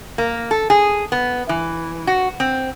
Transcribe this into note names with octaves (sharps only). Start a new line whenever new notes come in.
A#3
A4
G#4
B3
E3
F#4
C4